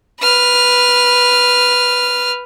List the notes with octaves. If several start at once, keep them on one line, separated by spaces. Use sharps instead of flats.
B4 F6